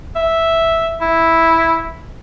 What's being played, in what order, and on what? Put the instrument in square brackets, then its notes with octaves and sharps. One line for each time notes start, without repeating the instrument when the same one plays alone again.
[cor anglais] E5
E4